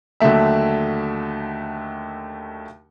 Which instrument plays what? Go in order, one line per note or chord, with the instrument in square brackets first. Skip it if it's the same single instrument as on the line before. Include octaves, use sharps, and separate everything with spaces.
[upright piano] D#2 D3 F#3 A3 E5